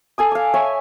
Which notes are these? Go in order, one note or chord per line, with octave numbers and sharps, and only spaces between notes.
A4 G#5 D#6
F5 D6
C#5 E5 G#5